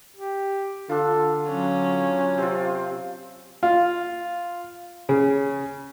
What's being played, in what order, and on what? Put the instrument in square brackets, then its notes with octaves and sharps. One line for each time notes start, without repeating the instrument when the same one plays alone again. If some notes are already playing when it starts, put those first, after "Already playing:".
[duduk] G4
[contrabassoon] D3 [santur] D4 F4 [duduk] A4
[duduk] F#3 [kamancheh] C#4
[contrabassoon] C3 [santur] C4 F4
[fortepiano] F4
C#3